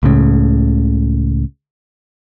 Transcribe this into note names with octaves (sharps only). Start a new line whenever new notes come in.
C#2 A2 C#3